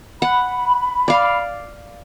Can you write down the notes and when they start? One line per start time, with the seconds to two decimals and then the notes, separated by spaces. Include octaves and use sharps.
0.22 F#5 B5
1.08 D5 F5